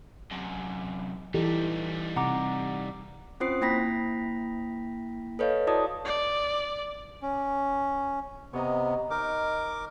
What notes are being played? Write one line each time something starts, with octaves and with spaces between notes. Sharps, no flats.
F#2 C3
E3 G3 D#4 G4 A4
C3 F#5 A#5 D6
C4 C#4 F4 C5 D#6 C7
A#3 E4 G5 B5 A#6 B6
A4 B4 C#5 D#5 F5
E4 F#4 A4 D5 A5 D#6
D5
C#4
C3 B3 C#5 D#5 A#5
D#4 A#4 D6